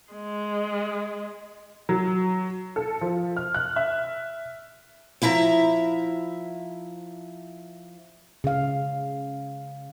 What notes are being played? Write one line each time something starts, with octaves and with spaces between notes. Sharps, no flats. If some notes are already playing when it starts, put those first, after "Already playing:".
G#3
F#3
A4
F3
F6
F#6
E5
F3 E4 E5 G5 A#5
C#3 F5